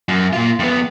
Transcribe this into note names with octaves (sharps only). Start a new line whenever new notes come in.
F#2
A#2 F4
F2 B3